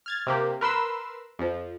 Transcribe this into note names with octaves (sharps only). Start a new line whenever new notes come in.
F6 G#6 A6
C3 A#3 G4
A#4 B4 C6 E6
F2 F3